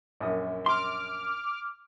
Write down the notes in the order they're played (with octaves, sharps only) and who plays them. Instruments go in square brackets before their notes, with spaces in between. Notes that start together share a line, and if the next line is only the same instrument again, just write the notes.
[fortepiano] A#1 F#2 D#6
[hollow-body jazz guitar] C6 [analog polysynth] D6 F6